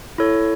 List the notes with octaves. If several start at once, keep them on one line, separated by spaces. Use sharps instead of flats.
E4 A4 C#5